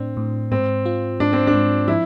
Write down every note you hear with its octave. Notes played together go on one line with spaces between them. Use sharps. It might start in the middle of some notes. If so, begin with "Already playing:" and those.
Already playing: A2 C4 D4
A2
G#2 C4
F4
G#2 D4
C4
D4
G#2
F3 E4